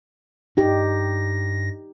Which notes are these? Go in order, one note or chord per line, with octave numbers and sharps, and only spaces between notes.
G2 D#4 G4 A#6